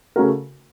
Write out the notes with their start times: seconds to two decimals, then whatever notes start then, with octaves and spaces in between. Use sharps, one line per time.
0.16 C#3 A3 C#4 F#4 A#4